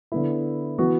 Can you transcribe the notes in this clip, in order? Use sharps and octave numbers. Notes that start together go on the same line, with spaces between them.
D3 B3 E4
E3 B3 F#4